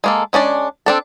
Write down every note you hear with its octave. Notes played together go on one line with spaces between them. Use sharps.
G#3 A#3 A4
G#3 C#4 D4 D5
C4 D4 A4